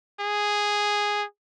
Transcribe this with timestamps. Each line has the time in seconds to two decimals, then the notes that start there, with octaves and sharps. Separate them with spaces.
0.20 G#4